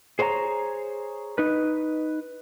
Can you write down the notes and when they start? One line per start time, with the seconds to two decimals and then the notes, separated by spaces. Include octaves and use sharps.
0.19 G#4 C5 C#5 F#5 A#5
1.38 D#4 B4